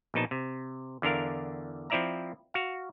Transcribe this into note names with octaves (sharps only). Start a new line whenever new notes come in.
A#1 B2 D#4 A5
C3
E2 D3 D4 A#4 F5
F3 C4 E4 D5 E5 A#5
F#4 F5